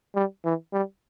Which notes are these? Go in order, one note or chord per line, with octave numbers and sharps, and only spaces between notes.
G3
E3
G3